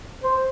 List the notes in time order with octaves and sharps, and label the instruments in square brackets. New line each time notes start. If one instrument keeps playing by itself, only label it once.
[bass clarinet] C5